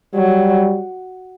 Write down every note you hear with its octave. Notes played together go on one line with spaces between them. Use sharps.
F#3 G3